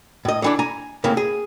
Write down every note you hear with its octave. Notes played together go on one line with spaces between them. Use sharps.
A2 D#5
D3 E3 D4
G#5 A#5
A2 C#3 A#3 C4 C#4
G#4